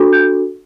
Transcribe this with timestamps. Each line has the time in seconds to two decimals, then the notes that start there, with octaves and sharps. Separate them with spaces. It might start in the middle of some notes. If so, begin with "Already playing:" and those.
Already playing: D4 F#4 A4
0.13 G6